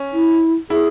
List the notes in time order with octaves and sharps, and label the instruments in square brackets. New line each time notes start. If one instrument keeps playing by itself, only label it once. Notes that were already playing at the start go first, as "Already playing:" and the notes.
Already playing: [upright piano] C#4
[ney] E4
[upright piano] E4 [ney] G#4